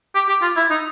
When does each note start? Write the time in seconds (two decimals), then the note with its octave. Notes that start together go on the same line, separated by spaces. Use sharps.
0.15 G4
0.28 G4
0.42 F4
0.56 E4
0.70 D#4